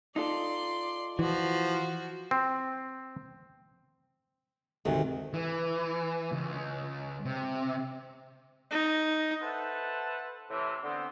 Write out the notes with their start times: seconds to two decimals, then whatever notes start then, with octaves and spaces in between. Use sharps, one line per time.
0.16 D#4 F4 A4 D5 C6
1.19 E3 F3 F#4
2.31 C4
4.85 D2 G#2 C3 D#3
5.34 E3
6.32 C#2
7.25 C3
8.71 D#4
9.41 A4 B4 C5 E5 F#5 A5
10.50 A2 C3 E3
10.84 D3 B3 C4 C6